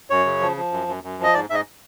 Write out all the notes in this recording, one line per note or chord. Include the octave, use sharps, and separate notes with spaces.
F#2 C#5
C#3
F3
F3
F#2
F#2
F#2
F3 D#5
G#2 D5
G#2 D#5 E5